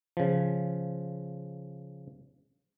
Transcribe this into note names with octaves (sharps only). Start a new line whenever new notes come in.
C#3 F3